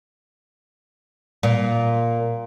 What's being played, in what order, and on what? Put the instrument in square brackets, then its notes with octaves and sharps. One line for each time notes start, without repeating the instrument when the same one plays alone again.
[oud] A#2